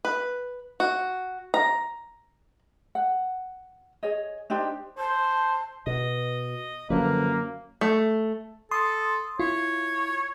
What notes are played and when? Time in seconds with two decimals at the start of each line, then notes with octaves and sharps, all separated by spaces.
0.05 B4
0.80 F#4
1.54 A#5
2.95 F#5
4.03 G#4 C#5 D#5
4.50 D4 D#4 G4 C5
4.98 C5 A5
5.87 B2 D#5
6.90 F#2 D3 F3 A#3 B4
7.81 A3
8.71 A4 C6 D#6
9.39 E4 F4 C#5